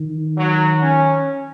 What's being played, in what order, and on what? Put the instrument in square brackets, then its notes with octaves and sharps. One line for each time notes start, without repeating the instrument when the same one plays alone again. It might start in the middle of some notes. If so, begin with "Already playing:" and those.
Already playing: [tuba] D#3
[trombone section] F#3
C#4